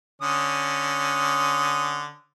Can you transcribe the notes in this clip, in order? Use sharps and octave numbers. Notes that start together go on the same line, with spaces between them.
D3 C#4 D#6